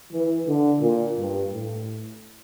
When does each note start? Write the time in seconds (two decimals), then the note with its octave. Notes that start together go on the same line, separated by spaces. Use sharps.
0.13 E3
0.47 D3
0.81 A#2
1.17 G2
1.52 A2